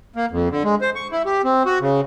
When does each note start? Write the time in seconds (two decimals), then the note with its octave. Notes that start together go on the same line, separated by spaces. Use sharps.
0.16 A#3
0.31 F2
0.51 D3
0.64 G#3
0.81 C5
0.96 C#6
1.11 E4
1.26 G4
1.44 C4
1.66 F#4
1.81 C#3